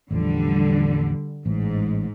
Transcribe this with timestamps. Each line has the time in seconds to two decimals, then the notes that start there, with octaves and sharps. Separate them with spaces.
0.11 A1 E2 D3 F3 G3
1.46 A1 G#2